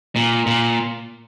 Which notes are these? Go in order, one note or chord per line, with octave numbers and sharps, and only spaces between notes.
A#2
A#2